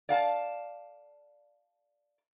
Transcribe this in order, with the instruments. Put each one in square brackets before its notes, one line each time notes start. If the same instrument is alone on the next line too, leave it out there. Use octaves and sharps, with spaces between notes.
[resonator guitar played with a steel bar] D5 F5 A5